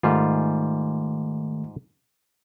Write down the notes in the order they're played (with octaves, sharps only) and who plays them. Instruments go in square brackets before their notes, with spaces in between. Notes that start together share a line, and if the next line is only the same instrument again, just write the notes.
[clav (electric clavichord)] G#2 G3 F4 [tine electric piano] D#3 A3